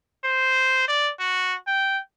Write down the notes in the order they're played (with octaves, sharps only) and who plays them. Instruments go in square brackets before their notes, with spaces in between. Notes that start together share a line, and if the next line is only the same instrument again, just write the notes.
[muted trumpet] C5
D5
F#4
G5